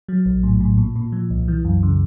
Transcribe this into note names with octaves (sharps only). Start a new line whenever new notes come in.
F#3
A#1
A2
A2
A#2
A#2
F3
C2
E3
F#2
C#3